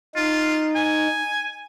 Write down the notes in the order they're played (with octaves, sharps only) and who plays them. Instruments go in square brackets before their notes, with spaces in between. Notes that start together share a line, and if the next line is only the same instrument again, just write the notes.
[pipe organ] D#4 [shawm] F4
[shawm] G#5